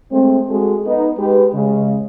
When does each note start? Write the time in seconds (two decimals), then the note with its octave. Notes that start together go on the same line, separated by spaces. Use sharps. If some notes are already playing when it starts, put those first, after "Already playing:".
0.12 G#3 A3 C4
0.50 G#3 F#4 G#4 A4
0.87 B3 D#4
1.18 G#3 G4 B4
1.54 C#3 G#3